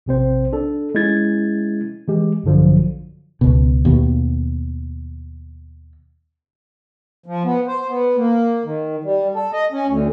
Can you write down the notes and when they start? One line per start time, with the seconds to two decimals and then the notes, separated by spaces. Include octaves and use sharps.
0.06 A#1 C3 C4 C5
0.53 D4 A4
0.94 G#3 C#4 E4 G#6 A6
2.08 E3 G#3 G4
2.44 A#1 G2 D3 F3 F#3
3.41 C#2 B2
3.85 D#2 B2
7.26 F3
7.45 B3
7.68 C5
7.89 B3
8.17 A#3
8.64 D#3
9.04 G3
9.35 A4
9.53 D#5
9.72 C#4
9.87 D2